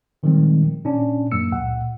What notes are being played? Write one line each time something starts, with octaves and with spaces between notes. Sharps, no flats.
A#2 D#3 F3 G3 G#3 C4
A#2 C#4 D4
F#2 F#3 A#3 E6 C#7
C#2 A#2 F#5